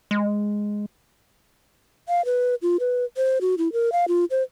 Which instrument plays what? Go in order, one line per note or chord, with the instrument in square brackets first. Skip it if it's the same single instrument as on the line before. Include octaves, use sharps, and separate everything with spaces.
[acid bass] G#3
[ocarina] F5
B4
F4
B4
C5
F#4
E4
A#4
F5
F4
C5